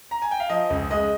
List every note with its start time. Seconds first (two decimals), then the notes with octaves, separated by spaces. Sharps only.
0.11 A#5
0.22 G#5
0.31 G5
0.40 F5
0.49 F3 D#5
0.70 C#2
0.91 G#3 D#5